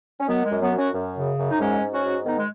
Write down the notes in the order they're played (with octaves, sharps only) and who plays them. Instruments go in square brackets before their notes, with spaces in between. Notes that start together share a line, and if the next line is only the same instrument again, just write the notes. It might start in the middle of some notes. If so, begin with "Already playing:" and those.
[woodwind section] C#4
D#3 F#3 B3
G#3
F#2
F#3 B3
F#2
C#4 F#4
F#2
C#3
F#2
D#4
G#2 G#3 C#4
G#2
C#4 F#4
G#2
D#3 B3 D#4
G#3